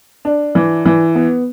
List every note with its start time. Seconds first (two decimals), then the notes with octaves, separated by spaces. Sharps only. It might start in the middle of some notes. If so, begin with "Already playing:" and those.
0.25 D4
0.55 E3
0.86 E3
1.15 B3